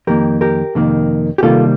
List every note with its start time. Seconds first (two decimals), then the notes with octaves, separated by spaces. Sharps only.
0.07 F2 D#3 A#3 G4 A#4
0.41 G4 A#4
0.75 F2 C3 D#3 A#3
1.38 G4
1.43 C3 D#3 G3 A#3 F4 A4